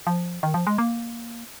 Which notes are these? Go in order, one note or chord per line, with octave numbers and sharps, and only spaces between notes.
F3
D#3
F3
G#3
A#3